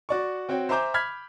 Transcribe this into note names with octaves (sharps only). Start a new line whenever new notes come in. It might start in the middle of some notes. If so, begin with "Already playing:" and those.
F#4 D5 C#6
C4 F#4 C#5 G5
C5 E5 G#5 A#5 D6 G6
B5 F6 G#6 B6